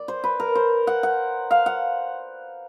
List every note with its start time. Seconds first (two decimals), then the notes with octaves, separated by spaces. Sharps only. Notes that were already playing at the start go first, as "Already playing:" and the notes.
Already playing: D5
0.08 C5
0.24 B4
0.40 A#4
0.55 C5
0.87 F#5
1.03 F#5
1.51 F5
1.66 F#5